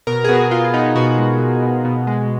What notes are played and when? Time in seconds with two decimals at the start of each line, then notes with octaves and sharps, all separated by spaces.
0.07 B2 A#4
0.24 G#4
0.29 B3 F#4
0.51 B3 F4
0.74 B3 D#4
0.95 B2 F#4
1.18 G#3
1.40 B2
1.62 B2
1.85 B2
2.07 G#3